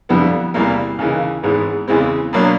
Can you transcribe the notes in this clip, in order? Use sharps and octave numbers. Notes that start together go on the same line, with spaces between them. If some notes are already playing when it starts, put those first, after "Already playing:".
F2 D3 G3 B3 E4
E2 C3 E3 G3 A#3
D#2 C#3 E3
G#1 G#2 E3 G#3 B3
E2 C#3 E3 G#3 C4
B2 F#3 A#3 D4